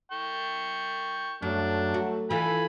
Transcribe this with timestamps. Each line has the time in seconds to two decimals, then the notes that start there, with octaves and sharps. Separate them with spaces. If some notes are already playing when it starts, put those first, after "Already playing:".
0.12 G5 C#6
1.42 F#2 F#3 A3 D4
1.94 F#4
2.31 E3 F4 A4 G#5 B5